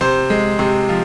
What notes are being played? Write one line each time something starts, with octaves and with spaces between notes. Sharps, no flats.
C3 C5
G#3
C3
F3